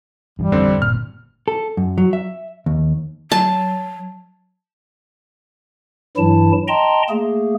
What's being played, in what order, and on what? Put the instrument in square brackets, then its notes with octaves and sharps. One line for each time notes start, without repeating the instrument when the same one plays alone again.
[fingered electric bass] G2 D#3 E3 [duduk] G3
[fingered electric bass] A1 F2 D4 [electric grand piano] D3 C4
[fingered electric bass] G1 F2 A#2 [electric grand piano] F6
[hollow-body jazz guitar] A4
F#2
F#3
E5
D#2
[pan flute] F#3 [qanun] A5
[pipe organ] G2 E3 F#3 E4 A5
D#5 G5 A5 A#5 C6
A3 A#3 G#4